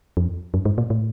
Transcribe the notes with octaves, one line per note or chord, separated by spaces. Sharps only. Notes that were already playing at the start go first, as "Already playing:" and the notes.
F2
F#2
G#2
A#2
A2